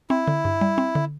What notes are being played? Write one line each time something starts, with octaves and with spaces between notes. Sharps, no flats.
C4 E4
D3
G2
G3
C4
D3